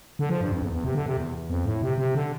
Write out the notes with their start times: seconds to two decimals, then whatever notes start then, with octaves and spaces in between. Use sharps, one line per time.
0.19 D3
0.29 F3
0.41 G2
0.52 F2
0.62 E2
0.73 E2
0.84 C3
0.95 D3
1.06 C3
1.17 E2
1.50 F2
1.65 A2
1.82 C3
1.98 C3
2.15 D3